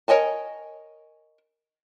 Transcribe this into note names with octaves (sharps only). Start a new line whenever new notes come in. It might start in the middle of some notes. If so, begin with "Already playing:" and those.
A#4 C#5 D#5 G#5 A5